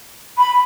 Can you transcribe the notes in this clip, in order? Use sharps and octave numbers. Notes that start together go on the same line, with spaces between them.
B5